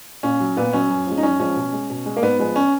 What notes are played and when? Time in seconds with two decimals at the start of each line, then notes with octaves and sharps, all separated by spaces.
0.23 A#2 C#4
0.40 F#3
0.57 A#2 B3
0.73 F#3 C#4
0.90 F#2
1.07 F3 G#3
1.18 D#4
1.23 F#2 C#4
1.40 F3 G#3 C#4
1.56 B2
1.73 G#3
1.90 B2
2.06 G#3
2.17 A#3
2.22 G#2 B3
2.39 F3 G#3 B3
2.56 C#4